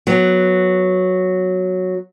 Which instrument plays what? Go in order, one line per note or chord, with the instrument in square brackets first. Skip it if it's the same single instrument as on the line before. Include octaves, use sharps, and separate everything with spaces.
[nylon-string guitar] F#3 B3